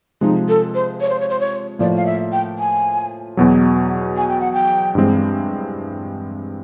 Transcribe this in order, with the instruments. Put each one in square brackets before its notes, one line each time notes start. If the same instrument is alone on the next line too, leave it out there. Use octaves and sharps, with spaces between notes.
[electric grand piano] C3 F3 G#3 [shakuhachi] D#4
[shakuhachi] A4
C5
C#5
C5
C#5
C5
C#5
[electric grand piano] A2 F3 A#3 [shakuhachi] D5
[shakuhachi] F5
E5
G5
G#5
[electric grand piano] E2 B2 F#3
[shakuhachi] G#5
G5
F#5
G5
[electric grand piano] G2 E3 G#3 C4